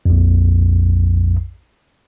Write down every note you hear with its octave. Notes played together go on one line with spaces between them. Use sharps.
A#1 F2